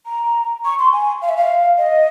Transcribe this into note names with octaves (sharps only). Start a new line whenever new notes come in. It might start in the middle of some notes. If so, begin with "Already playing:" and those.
A#5
C#6
C6
G#5
F5
E5
F5
D#5